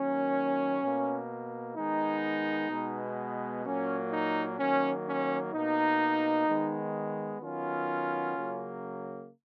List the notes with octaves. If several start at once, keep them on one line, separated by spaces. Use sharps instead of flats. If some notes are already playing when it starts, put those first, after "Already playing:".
Already playing: D#3 F#3 A#3 C#4
B2 A#3
D#3 G#3 B3 D#4
B2 G#3 B3
A#2 F#3 A#3 C#4
D#4
D#3 F#3 A#3 C#4
C#4
B2 A#3 D#4
D#3 G#3 B3
D#3 F#3 B3 C#4 F4
C#3 F#3 A#3